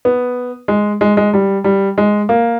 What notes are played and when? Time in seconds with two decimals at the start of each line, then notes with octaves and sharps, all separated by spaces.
0.05 B3
0.68 G#3
1.01 G#3
1.17 G#3
1.33 G3
1.64 G3
1.98 G#3
2.29 A#3